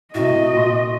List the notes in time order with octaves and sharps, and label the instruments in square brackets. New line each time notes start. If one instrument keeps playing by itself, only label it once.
[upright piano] A2 C3 [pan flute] F#4 [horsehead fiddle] D#5
[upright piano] A#2 C6